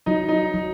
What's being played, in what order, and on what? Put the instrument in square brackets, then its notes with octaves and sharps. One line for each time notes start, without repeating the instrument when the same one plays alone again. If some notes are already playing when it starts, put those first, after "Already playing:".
[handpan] F#3 [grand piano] D#4
[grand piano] D#4
[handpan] F#3